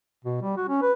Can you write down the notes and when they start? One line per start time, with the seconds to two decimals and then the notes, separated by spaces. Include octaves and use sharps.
0.25 B2
0.42 G3
0.57 F#4
0.69 C#4
0.82 B4